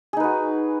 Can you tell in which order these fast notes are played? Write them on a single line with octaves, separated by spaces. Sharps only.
G#4 D#4 B4 F#4